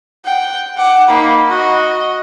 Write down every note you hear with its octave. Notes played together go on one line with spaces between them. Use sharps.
F#5 G5
F#5 D6
A#3 D#4 B5
F#4 D#5